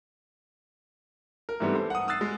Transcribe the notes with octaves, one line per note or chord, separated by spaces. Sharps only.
A#4
G#2 E3 G3 A3 B3 C4
A4 C5
F#5 D#6
D#6 E6 F#6 A6 C7
G#3